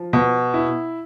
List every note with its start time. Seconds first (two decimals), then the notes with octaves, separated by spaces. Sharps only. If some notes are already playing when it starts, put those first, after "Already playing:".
Already playing: F3
0.13 B2
0.54 E4